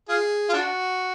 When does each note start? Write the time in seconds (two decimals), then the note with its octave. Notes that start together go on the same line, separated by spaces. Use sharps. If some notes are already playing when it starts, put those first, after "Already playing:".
0.09 F4 G#4
0.49 F4
0.53 D4 F#4